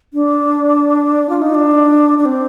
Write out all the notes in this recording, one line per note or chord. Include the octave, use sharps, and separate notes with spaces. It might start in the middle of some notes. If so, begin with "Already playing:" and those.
D4
F4
D#4
D4
D4
C4